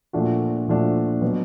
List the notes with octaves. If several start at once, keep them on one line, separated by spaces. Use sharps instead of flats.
A#2 F3 A3 D4 F#4
A#2 F3 A3 D4 F#4
B2 F#3 B3